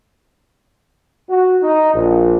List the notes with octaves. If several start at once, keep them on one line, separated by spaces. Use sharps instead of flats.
F#4
D#4
A#1